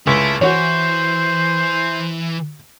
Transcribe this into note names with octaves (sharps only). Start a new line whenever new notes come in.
C#2 E4 A4 E5
E3 F#4 C5 C#5